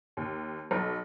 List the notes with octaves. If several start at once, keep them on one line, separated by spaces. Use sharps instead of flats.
D#2
B1